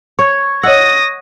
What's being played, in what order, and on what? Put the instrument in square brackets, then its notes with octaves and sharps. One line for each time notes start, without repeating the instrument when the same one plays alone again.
[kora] C#5 [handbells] C#6 G#6
[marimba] C#5 D#5 E6 [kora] F#5 [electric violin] D#6 A#6